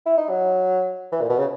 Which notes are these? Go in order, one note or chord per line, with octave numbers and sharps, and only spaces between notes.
E4
D#4
F#3
E3
A#2
B2
C#3